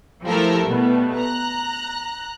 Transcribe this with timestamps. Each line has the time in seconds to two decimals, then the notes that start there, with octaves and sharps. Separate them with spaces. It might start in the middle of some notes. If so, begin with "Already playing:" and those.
0.24 F3 A3 E4 G4 A4 A#4
0.67 B2 G3 A3 B3
1.15 A#5 F#6